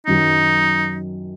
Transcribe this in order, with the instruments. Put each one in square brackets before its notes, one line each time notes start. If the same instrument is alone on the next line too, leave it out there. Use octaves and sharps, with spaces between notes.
[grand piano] F#2 D#3 F#3 [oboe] D#4